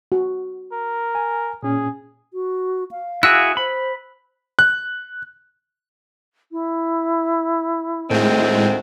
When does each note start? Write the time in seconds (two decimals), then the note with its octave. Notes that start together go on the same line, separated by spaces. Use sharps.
0.12 F#4
0.72 A#4
1.15 G#5
1.63 A#2 C#4 G#4
2.34 F#4
2.91 F5
3.23 E4 F#4 G#4 E6 F#6
3.57 C5 B5
4.59 F#6
6.52 E4
8.10 D2 A2 D#3 G#3 C4